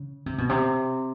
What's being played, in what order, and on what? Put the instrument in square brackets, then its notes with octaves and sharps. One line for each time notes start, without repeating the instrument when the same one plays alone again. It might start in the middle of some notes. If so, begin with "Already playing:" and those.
Already playing: [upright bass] C#3
C3
B2
C3